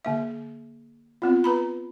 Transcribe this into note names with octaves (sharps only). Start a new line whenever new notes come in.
D3 A#3 E5
B3 C4 F4
B4 A#5 B5